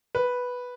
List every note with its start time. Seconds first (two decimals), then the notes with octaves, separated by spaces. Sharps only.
0.15 B4